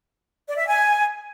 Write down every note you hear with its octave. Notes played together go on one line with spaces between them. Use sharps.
D5
E5
G#5